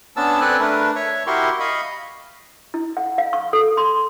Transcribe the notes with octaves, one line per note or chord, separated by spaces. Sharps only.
B3 C#4 D4 A5 E6
C4 A4 B4 D5 G#5 F#6
A3 D4 A#4 B4
C#5 E5 C#6
E4 F#4 G4 A#4 C6 C#6
D#5 F5 B5 C#6
E4
F#5
F5
C#6
A4
C6